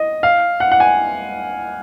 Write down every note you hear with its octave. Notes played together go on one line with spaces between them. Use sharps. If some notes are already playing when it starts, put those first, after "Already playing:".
Already playing: D#5
F5
F#5
F#5
G#5